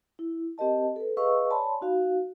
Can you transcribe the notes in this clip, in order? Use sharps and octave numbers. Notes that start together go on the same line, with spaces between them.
E4
C4 G4 A#4 D#5 A5
A4 B4
G#4 B4 D#5 F5 C#6 E6
C#5 D5 G#5 A5 B5 C6
D#4 F#4 F5